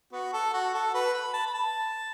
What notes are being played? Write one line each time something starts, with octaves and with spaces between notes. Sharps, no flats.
B3 F#4
A4
F#4
A4
F#4 B4
B5
A5
B5
A5